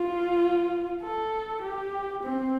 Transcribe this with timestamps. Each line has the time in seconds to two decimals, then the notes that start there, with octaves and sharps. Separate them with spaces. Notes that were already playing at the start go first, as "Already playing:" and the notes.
Already playing: F4
1.02 A4
1.62 G4
2.23 C4